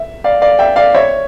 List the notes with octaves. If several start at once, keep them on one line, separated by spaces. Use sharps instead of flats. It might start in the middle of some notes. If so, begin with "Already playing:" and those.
Already playing: E5
D5 F5
D5 F5
E5 G5
D5 F5
C#5 E5